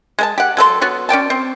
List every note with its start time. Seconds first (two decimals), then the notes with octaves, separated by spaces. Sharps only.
0.19 G#3 A#4 A5
0.38 G4 F#5
0.57 F#3 A4 C5 C6
0.81 B3 F#4 C#5
1.09 C#4 D5 G5 A5
1.30 C4